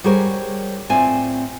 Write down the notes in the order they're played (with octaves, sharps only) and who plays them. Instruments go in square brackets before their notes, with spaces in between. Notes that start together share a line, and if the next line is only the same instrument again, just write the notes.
[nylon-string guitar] G3 F#4 G#4 A#4 C5 C#5
A2 C4 F4 D5 G#5